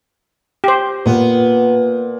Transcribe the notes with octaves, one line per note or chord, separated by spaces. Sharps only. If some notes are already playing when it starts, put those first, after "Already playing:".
G4 C5
A#2 B3